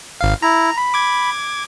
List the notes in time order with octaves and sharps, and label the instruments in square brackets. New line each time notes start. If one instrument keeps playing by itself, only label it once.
[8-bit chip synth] G#1 F5
[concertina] E4 [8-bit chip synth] A#5
[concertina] B5
[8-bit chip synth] D6 G#6